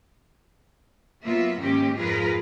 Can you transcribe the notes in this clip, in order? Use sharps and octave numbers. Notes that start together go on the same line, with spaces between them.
F#3 A#3 B3 F4 E5
G#2 D#3 G#3 A#3 C#4 G4
F2 G#2 F4 G#4 A#4 B4